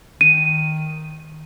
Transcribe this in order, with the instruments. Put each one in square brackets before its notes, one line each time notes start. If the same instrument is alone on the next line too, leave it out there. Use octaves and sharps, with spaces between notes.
[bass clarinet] D#3 [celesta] D#7